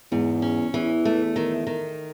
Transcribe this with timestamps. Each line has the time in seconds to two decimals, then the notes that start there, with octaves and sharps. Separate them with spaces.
0.11 E2 G#2
0.42 C#4
0.73 E2 E3
1.05 A3
1.36 D#3
1.67 D#3